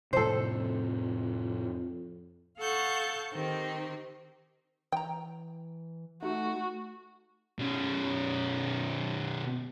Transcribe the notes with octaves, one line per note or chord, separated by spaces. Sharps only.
F2 A2 C3 A4 C5
A4 F5 F#5 A5 C#6 G6
D#3 C4 G4
E3 G5 A#5
A3 D#4 F#4
B2 C#4